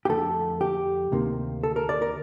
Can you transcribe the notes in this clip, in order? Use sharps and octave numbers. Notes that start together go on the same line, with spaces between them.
G4
F2 D3 A3 A4
G4
D2 C3 D#3 A#3
A4
A#4
D5
A#4